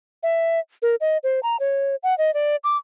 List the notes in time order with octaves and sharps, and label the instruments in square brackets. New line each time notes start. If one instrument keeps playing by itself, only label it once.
[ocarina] E5
A#4
D#5
C5
A#5
C#5
F#5
D#5
D5
D6